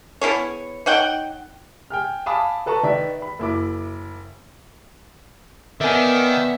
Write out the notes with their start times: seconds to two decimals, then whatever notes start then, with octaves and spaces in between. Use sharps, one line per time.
0.21 B3 E4 G#4 C#5
0.86 D#4 C#5 F#5 G5
1.90 G5 G#5 F6
2.26 F5 G#5 A5 B5 D6 D#6
2.66 A4 B4 A5 A#5 C#6
2.83 D#3 B4 D5 E5
3.22 B5
3.39 F#1 E4 D6
5.81 D#3 B3 D5 E5 G#5